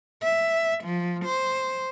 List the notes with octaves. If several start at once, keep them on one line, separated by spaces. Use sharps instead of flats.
E5
F3
C5